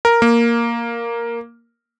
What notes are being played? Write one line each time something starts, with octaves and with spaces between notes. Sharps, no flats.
A#4
A#3